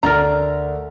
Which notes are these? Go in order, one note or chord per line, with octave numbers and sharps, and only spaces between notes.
D2 A#4 D5 A#5